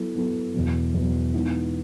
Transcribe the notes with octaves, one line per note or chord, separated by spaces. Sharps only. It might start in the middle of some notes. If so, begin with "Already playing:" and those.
Already playing: F#3 B3 E4 A4
F#3 B3 E4 A4
E2 B2 F#3
E2 B2 F#3
E3 G#3 B3 D#4